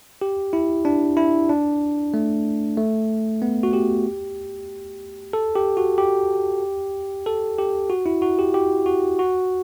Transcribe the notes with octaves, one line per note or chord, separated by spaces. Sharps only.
G4
E4
D4
E4
D4
A3
A3
B3
F#4
G4
A4
G4
F#4
G4
A4
G4
F#4
E4
F#4
G4
G4
F#4
F#4